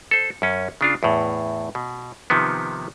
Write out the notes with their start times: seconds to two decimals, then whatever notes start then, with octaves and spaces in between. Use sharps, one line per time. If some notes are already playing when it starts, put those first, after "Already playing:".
0.11 A4 C5
0.42 F#2 C#4
0.81 C#3 D4 F4
1.03 E2 A2
1.75 B2
2.30 C3 D#3 F3 B3